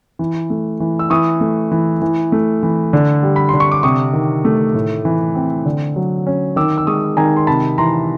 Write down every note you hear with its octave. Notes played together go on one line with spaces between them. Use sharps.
E3
A3
E3
E6
E3 C#6 D#6
A3
E3
E3
A3
E3
D3
G3
B5
D3 C6
C#6
D6
C3 C#6 D#6
D#3
A3
A2
E3
C4
D3
F#3
C#4
D#3 D6 E6
E6
G#3 C#6 D#6
D#3 G#5 A#5
C6
C3 A5 B5
E3 A#5 C6